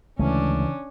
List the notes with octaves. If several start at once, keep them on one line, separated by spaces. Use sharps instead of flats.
D2 C#3 E3 G#3 A3 C#4 D4